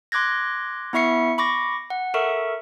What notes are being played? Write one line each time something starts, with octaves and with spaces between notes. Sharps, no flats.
C6 D6 F#6 G#6 A#6
B3 E4 E5 C#6 C7 C#7
B5 C#6 D6 A#6
F#5
A4 A#4 E5 C#6